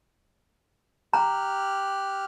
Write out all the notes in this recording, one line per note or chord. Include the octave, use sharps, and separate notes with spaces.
G4 A#5 F6 F#6